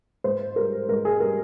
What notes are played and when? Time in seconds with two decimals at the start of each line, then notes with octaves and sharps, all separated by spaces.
0.24 G#2 C5
0.56 G3 A#4
0.89 G#2 A#4
1.05 G#4
1.20 G3 A#4